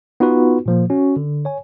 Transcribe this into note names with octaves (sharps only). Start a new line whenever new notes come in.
B3 D#4 F4 F#4 B4
A#2 F3 A#3
C#4 F#4
D3
C#5 G#5